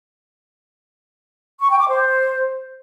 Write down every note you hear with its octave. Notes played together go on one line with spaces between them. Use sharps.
C#6
G5
D6
C5